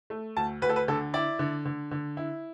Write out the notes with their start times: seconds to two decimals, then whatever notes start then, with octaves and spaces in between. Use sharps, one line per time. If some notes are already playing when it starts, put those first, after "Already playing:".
0.10 A3
0.36 D2 A5
0.62 D2 B4
0.69 A4
0.76 B4
0.88 D3 A4
1.14 E4 D5
1.39 D3
1.65 D3
1.91 D3
2.17 E4